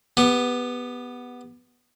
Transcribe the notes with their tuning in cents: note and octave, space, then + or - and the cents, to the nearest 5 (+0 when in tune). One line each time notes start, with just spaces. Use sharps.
B3 +0 G4 +30